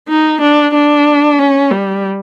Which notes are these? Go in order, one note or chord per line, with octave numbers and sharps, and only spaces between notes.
D#4
D4
D4
C#4
G3